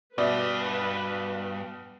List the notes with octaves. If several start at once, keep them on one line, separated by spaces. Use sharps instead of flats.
G2 B2 B4 D5 E5